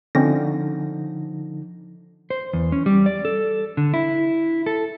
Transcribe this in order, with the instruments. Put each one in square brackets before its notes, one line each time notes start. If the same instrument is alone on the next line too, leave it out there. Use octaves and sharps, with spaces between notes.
[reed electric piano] D3 F3 D#4 [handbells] C4 C#4 A#6
[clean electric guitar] C5
E2
C#4
G3
D5
A4
D3
E4
A4